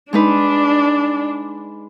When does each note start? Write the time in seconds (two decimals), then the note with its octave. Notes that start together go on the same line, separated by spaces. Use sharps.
0.13 G#3 D4 D#4 B4